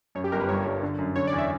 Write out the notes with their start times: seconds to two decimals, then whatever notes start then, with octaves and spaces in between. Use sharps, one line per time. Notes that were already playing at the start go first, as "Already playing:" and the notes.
0.15 F#2 C#5
0.24 G4
0.32 G1 A#4
0.41 B4
0.49 G2 C#5
0.66 G1
0.82 D3
0.98 F#2
1.16 D3 C#5
1.27 D5
1.33 E2
1.38 E5